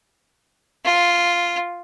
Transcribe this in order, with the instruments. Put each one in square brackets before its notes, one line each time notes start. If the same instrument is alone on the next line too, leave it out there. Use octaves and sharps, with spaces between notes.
[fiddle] F4